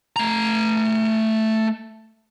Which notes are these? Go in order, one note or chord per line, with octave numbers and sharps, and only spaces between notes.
A3 A#5